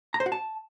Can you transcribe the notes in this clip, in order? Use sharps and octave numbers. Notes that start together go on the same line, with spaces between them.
A#5
C5
F#4
A5